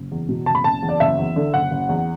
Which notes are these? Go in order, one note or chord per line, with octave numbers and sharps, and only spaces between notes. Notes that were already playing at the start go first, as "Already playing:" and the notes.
Already playing: F#1
E2
B2
F#1 A5
B5
F#1 A5
E2
D5
F#1 E5
E2
D3
F#1 F#5
F#1
E2